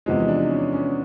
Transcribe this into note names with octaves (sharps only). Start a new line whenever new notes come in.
E2 C3 F3 G#3 D#4
D#4
D4
C#4
C#4